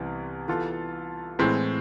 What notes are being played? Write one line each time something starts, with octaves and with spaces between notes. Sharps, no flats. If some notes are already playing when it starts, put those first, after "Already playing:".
Already playing: C2 C3 E3 B3
E3 B3 F4 A4
A2 E3 G#3 C4